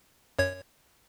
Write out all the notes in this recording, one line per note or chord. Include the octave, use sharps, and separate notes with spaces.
F#2 C#5 G#6